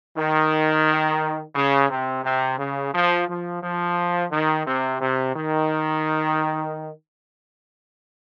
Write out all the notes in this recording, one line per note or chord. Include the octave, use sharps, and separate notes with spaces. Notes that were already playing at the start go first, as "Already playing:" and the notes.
D#3
C#3
C3
C3
C#3
F3
F3
F3
D#3
C3
C3
D#3